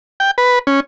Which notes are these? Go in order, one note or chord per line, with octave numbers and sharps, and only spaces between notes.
G5
B4
C#4